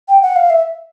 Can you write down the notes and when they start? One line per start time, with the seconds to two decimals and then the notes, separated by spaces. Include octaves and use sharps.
0.09 G5
0.22 F#5
0.36 F5
0.50 E5